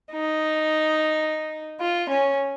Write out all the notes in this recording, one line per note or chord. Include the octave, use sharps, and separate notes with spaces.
D#4
F4
C#4